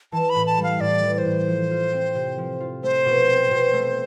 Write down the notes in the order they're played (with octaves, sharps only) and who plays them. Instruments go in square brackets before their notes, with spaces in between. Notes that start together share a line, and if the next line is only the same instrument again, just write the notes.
[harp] E3 [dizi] A5
[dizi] B5
[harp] A2
[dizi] A5
[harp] G3
[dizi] F5
[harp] A2 [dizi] D5
[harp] E3
[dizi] D5
C5
[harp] A2
F3
F4
C4
C3
F3
F4
[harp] A3 [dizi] C5
[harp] B2
C4
B2
A3